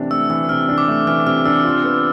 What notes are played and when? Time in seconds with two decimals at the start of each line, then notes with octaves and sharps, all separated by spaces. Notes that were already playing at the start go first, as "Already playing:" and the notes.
Already playing: C3 E3 A3 D4
0.10 A3 E6
0.30 E3 E6
0.49 C3 F6
0.69 D4
0.78 D6
0.88 A3
1.07 E3 F6
1.26 C3 F6
1.45 D4 E6
1.65 F4
1.84 B3